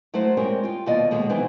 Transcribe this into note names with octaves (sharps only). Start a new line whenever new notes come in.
F#3 A3 E4 F#4 C5
G3 G#3 C4 G4 A#4 C#5
F4 G5
D#2 B2 G3 F4 D5 D#5
D#2 B2 G#3 A4
E3 F#3 B3 C4 D#4